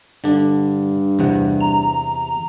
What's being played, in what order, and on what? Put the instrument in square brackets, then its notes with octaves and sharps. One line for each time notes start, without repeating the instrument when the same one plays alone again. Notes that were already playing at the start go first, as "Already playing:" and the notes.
[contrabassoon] G2 [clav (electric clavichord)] D3 D4
[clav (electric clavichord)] E2 C3 F#5
[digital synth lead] A#5